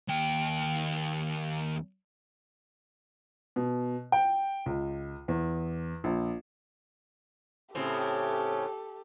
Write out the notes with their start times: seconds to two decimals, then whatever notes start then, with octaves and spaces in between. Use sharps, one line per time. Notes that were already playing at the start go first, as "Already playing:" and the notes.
0.09 D#2 G5
3.56 B2
4.12 G5
4.66 C#2
5.28 E2
6.04 A#1
7.75 A2 C#3 C4 G4 A4